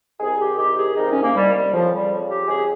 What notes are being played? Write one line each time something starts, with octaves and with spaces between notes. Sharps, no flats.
C2 C3 D#3 G#4
G4
C2 C3 D#3 G4
G#4
C2 C3 D#3 D#4
C#4
A#3
C2 C3 D#3 G3
G3
F2 C#3 F3
G3
F2 C#3
G4
F2 C#3 G#4